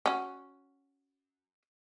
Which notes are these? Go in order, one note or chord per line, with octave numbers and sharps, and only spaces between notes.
C#4 F#4